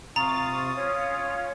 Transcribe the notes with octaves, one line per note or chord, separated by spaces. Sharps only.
C3 F4 A#5 C#6 D#6 A6
C#4 F4 C#5 F5